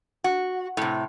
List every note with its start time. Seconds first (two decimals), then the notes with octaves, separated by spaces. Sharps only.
0.24 F#4
0.77 A2 C3